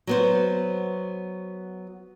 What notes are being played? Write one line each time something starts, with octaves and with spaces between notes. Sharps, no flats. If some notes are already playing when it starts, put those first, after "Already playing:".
F#3 B3 C5